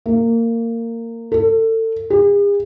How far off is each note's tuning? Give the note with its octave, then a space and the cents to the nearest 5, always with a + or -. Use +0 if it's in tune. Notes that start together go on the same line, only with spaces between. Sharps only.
A#3 -20
A4 +30
G#4 -45